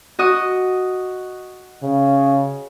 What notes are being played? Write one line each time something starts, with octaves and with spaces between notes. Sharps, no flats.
F#4 D#5 D#6
C#3